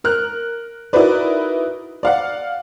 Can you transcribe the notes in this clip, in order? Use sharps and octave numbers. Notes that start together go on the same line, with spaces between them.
A#4 F6 F#6
D#4 E4 F#4 A#4 B4 D5
D5 F5 F#5